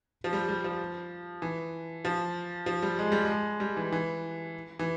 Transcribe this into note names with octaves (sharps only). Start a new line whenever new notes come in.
F3
G3
G3
F3
E3
F3
F3
G3
G#3
G3
G#3
G3
E3
E3
E3